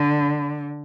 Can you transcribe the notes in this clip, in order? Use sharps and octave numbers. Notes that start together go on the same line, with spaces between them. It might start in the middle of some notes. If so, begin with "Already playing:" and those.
Already playing: D3